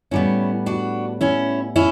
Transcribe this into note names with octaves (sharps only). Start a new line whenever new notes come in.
A2 G3 B3 C#4 E4
D4 F#4
C#4 E4
C#4 E4